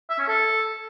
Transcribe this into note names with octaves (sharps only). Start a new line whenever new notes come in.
E5
C#4
A4